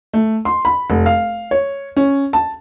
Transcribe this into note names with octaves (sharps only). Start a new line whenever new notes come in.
A3
C6
B5
F1
F5
C#5
C#4
A5